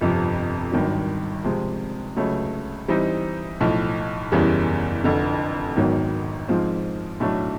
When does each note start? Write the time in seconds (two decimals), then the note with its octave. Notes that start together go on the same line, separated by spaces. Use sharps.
0.01 G1 F2 C3 F3
0.72 G#1 G2 D#3 F#3
1.44 C3 F3 G#3 C4
2.17 C#2 C#3 F#3 A3
2.88 E3 G3 C4 D#4
3.61 B1 A2 F3
4.32 F#1 E2 C#3 E3 G3
5.04 F1 F2 D3
5.76 G#1 G#2 D#3 F#3 B3
6.49 G#2 F3 G#3 C4 F4
7.20 B1 A2 F#3 A3 D4